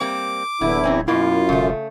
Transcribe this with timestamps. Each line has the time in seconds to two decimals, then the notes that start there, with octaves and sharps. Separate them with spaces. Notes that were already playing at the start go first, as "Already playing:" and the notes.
0.01 G3 A#3 C4 D6
0.61 D1 E2 D3 E4
0.84 E3 C4 C#4
1.08 F#2 B2 A#3 E4 F4
1.49 E1 C#3 A3